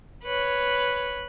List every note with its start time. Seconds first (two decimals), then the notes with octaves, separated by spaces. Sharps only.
0.24 B4 C#5